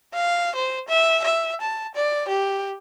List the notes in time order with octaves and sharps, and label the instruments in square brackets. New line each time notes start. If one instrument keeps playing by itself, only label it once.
[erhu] F5
C5
E5
E5
A5
D5
G4